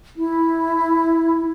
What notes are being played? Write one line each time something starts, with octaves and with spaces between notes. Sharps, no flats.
E4